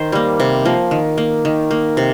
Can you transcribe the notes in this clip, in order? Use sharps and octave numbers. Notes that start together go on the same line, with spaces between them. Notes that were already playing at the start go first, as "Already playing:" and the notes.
Already playing: D#3 C5
G3 A#3
C3
F3 A#3
D#3
A#3
D#3
A#3
C3